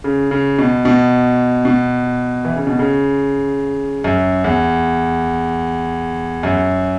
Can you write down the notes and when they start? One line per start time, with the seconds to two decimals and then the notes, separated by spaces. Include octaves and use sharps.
0.04 C#3
0.31 C#3
0.59 B2
0.85 B2
1.65 B2
2.45 E3
2.56 C#3
2.67 B2
2.79 C#3
4.04 F#2
4.44 E2
6.43 F#2